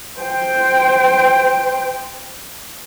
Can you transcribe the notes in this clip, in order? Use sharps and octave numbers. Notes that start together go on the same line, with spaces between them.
C5 G5